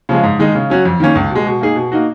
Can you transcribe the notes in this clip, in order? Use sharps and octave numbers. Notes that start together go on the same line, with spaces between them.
C#3 F3 G#3
G#2
D#3 G#3 D#4
C#3
F#3 C#4 F#4
F2
D#3 A#3 C#4
C#2
B2 G#3
B2
A#3 D#4 G#4
B2
A#3 D#4 F#4